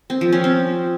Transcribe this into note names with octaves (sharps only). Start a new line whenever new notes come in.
C4
F3
C#4
C4